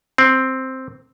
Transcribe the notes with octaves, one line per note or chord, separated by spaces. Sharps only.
C4